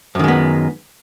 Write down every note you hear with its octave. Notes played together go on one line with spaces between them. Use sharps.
F#2 D#3 G#3 B3